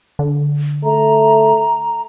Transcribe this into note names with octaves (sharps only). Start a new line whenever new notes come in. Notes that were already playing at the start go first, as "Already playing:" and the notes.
D3
A3 A#5